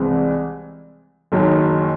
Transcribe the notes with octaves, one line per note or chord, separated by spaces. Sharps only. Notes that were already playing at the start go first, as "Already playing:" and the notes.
Already playing: C2 C3 E3 G#3 C4
F#1 F#2 D#3 F#3